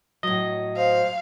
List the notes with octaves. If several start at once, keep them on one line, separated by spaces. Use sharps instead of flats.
A2 F#3 D#5
C5 F5